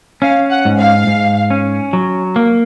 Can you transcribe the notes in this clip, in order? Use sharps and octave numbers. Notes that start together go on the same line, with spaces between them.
C#4 F5
F#5
G#2
F5
G#2
C#4
F#3
A#3